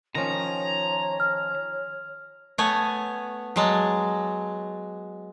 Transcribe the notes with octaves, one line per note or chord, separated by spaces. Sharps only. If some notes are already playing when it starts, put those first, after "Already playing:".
D#3 F3 C#4 C#5 A#5
F6
A3 B3 C#5 G#5
F#3 G#3 A5